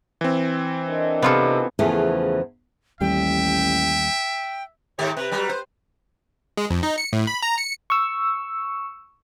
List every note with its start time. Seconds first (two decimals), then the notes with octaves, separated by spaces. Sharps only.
0.21 E3 C4
0.88 D4 A#4 D#5
1.22 C3 B3 F4 A4
1.79 E2 C#3 E3 F3 A3
3.01 A1 D#2 G3 E5 G5
4.99 G#2 D#3 A#3 G4 C5 C#5
5.17 C3 B4
5.31 F#3 G3
5.49 C5
6.57 G#3
6.70 F2
6.83 D#4
6.98 C#7
7.13 A2
7.27 B5
7.42 A#5
7.58 C#7
7.90 C#6 E6